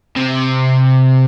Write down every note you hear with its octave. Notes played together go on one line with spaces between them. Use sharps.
C3